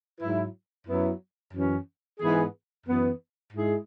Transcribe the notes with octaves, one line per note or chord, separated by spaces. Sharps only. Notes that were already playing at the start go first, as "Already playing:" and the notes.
G#2 F#3 E4
F#2 F#3 B3 E4
F#2 E3 C#4
G#2 E3 B3 G#4
F#2 E3 B3
G#2 G#3 E4 G#4